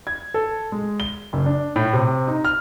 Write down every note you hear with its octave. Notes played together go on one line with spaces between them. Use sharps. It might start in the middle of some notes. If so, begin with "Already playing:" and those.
G#6
A4
G#3
G7
F#1
D4
A2
C3
D#4
F6